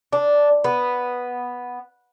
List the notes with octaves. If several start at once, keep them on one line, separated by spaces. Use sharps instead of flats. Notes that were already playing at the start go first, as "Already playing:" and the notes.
D4
B3